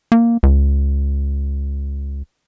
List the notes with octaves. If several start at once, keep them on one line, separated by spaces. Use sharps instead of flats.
A#3
C#2